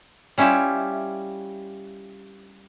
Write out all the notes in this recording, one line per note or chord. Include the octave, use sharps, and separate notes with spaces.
G3 C#4 E4 F4 G4 E5